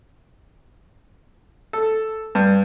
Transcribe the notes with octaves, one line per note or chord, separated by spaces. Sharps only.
A4
G2